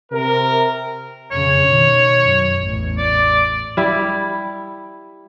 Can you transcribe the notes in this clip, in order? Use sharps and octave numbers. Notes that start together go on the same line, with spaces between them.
C3 A#4
F2 C#3 C#5
B2 D#3
F#2
A1 E2
D5
G3 E4